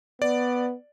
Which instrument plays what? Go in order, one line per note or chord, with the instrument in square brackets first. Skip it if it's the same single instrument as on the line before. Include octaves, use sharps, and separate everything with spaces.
[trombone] B3 [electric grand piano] D5